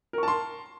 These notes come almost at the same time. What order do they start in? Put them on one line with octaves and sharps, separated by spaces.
A#4 C#6 A5 C6